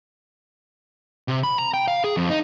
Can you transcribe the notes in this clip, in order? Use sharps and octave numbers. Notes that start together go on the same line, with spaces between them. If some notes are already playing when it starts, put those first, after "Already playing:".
C3
B5
A#5
G5
F5
G#4
F2
D#4